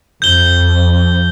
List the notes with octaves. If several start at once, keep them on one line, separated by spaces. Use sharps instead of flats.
F2 G6 G7